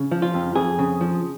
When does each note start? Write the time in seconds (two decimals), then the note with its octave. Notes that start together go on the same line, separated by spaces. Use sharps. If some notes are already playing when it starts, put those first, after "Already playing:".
Already playing: C#3
0.11 F3
0.22 F4
0.34 F2
0.55 F2 G#4
0.79 C#3
1.01 F3